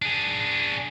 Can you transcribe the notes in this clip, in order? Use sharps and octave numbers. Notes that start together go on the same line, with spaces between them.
D4 G#4